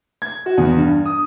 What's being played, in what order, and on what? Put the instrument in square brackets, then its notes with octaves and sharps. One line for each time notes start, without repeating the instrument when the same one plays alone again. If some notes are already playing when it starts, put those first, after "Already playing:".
[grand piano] G#6
F#4
E2
G2
D#6